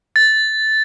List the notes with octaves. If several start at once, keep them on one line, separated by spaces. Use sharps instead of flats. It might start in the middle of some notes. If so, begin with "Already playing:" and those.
A6